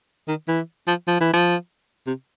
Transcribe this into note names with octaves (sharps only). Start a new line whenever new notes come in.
D#3
E3
F3
F3
E3
F3
C3